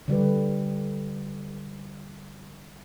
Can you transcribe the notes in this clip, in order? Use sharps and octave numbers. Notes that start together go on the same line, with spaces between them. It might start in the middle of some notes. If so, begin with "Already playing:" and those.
D3 G3 G4 B4